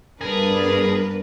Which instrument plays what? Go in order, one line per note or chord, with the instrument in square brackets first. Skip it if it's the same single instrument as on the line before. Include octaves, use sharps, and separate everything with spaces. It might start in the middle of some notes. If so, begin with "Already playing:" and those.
[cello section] G2 B3 D4 [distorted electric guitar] G#4 [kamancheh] A#4 [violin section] B4